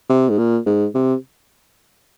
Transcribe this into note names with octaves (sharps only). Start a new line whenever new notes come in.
C3
G#2
A#2
G#2
C3